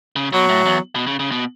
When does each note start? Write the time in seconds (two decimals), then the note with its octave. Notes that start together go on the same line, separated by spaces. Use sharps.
0.16 C#3
0.33 B2 F#3
0.49 A2
0.66 E2
0.95 B2
1.07 C#3
1.19 C#3
1.32 B2